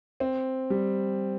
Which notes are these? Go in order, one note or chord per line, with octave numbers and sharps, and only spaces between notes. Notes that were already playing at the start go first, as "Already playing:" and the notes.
C4
G3